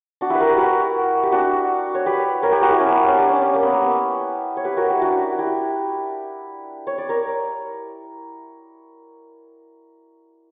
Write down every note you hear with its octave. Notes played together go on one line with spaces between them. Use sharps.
D4 F#4
E4 G4 B4
F#4 A#4
G4 B4
F#4 A#4
G4
D4 F#4
C#5
G4 B4
A#4 C#5
G4 B4
F#4 A#4
E4 G4
C#4
B3
C#4
D4
C#4
C#4
A#3
B3
A#3
B3
C#5
G4 B4
F#4 A#4
E4 G4
D4 F#4
F#4
E4 G4
C#5
D5
A#4 C#5